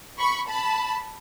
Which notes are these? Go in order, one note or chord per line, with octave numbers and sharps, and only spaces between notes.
B5 C#6
A5 B5